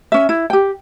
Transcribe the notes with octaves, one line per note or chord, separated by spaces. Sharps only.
C#4 E5
E4
G4 G5